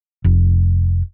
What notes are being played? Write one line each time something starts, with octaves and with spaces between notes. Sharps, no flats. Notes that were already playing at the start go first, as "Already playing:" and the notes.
F1